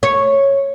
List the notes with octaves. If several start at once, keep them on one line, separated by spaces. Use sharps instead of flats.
C#5